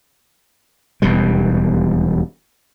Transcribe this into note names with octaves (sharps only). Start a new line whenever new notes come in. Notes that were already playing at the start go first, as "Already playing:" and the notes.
E1 D#2 B2 G3